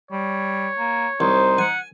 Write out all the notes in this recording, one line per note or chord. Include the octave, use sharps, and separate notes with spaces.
G3 C#5
A#3
C2 D#4 C5
F#5 G#5